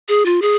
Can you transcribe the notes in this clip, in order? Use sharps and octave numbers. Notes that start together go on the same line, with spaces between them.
G#4
F4
G#4